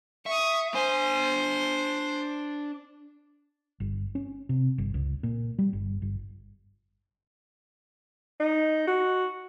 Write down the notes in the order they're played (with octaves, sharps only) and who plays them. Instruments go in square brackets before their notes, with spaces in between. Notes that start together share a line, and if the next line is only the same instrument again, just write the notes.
[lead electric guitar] E5 [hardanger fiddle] C#6 D#6
[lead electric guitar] D4 G#5 [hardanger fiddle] C5
[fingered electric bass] G1
C#4
C3
G1
C#2
A#2
G3
G1
G1
[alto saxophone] D#4
F#4